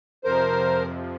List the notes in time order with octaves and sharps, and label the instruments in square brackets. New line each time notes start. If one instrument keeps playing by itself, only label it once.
[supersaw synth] F2 C3 F3 [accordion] A#4 C5